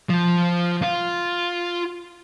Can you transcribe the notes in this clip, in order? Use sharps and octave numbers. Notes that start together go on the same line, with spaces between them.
F3
F4